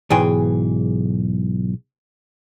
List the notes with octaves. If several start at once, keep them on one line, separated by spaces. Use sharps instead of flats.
B1 G#2 E3 G#4 G5